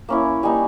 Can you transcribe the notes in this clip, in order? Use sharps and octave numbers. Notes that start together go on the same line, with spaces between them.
A#3 C#4 E4
G3 A#3 D#4 G#5